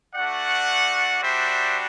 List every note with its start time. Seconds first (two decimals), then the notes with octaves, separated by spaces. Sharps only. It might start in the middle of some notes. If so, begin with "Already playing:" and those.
0.15 A3 D4 F#4 D5 F#5
1.22 G3 D4 F#4 C5 E5